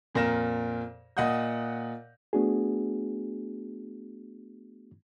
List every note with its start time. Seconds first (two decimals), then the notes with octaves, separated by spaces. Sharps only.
0.15 F2 A#2 A#4 A#6 E7
1.17 A#2 D#5 F#5 D#6 G6
2.33 A3 B3 D4 F#4 G#4